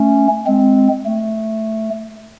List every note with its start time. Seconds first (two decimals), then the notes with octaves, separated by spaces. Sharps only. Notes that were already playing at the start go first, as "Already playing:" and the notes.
Already playing: A3 C#4
0.46 G#3 C4
1.06 A3